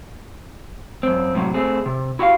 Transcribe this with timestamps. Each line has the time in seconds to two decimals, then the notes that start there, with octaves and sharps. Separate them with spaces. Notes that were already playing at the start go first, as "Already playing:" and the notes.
1.03 F#2 C4
1.34 F#2 A2 C3 F#3
1.54 A3 C4 G#4
1.86 C3
2.19 E4 F#4 G4 E5 F5